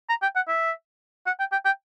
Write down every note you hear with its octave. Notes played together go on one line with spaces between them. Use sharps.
A#5
G5
F#5
E5
F#5
G5
G5
G5